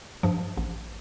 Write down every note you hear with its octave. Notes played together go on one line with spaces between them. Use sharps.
G2 F3
A1